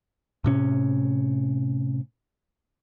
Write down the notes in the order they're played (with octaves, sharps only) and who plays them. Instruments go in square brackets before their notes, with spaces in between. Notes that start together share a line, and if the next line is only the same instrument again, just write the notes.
[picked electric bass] A2 C3 C#4